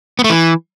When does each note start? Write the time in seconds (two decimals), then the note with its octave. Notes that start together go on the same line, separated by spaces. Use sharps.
0.19 B3
0.24 A3
0.30 E3